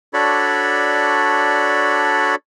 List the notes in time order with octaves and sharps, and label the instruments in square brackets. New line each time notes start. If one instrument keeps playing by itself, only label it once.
[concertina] D4 F#4 A4 C#5 D5 B5